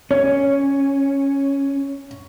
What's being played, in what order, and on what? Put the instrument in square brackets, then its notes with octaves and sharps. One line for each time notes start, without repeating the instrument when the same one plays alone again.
[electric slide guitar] C#4 [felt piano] C#5